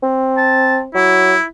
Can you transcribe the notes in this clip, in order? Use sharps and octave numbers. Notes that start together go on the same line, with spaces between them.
C4
A5
F#3 E4